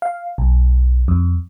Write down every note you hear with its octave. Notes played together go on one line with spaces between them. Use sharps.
F5
B1
F2